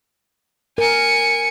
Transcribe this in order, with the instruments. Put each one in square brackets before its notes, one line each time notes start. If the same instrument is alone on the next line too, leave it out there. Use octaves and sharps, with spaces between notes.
[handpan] A#4 [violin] G#5 C#7